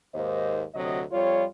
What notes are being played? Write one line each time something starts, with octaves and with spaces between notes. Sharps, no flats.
D#2 G#2 A#3 C5 D#5
D2 C3 F#3 D#5
F2 G3 F4 C#5